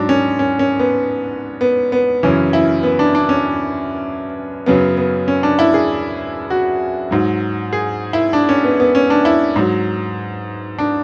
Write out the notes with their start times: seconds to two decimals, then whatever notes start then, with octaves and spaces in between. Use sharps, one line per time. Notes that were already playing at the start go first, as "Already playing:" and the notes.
Already playing: G#2 F#3 D4
0.09 C#4
0.39 C#4
0.59 C#4
0.79 B3
1.61 B3
1.92 B3
2.23 F#2 C#3 E3 C#4
2.53 E4
2.83 B3
2.99 D4
3.15 D4
3.29 C#4
4.66 F#2 C#3 F#3 B3
4.97 B3
5.28 C#4
5.43 D4
5.59 E4
5.74 G#4
6.50 F#4
7.11 G#2 F#3
7.73 G#4
8.13 E4
8.33 D4
8.49 C#4
8.64 B3
8.80 B3
8.95 C#4
9.10 D4
9.25 E4
9.56 G#2 F#3
10.79 D4